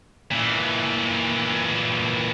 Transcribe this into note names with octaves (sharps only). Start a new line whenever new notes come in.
A#2 E3